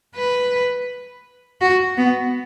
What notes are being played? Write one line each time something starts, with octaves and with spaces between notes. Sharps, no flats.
B4
F#4
B3